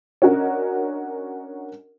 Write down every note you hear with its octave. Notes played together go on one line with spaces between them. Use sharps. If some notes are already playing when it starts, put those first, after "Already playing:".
C#4 D4 F#4 A#4 D#5